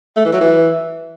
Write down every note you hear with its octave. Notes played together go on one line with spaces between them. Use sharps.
A3
E3
F#3
E3